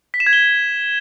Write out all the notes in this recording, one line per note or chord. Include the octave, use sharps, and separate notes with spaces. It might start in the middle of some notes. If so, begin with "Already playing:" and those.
B6
E7
G#6
G7